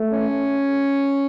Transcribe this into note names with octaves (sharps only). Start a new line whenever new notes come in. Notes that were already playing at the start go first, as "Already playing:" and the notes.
Already playing: A3
C#4